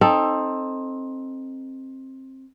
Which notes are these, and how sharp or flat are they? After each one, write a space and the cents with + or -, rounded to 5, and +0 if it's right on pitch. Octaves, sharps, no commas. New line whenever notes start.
C4 +20 D#4 +0 A4 +0